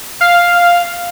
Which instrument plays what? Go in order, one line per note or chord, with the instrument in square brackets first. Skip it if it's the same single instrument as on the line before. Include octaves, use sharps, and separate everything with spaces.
[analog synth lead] F5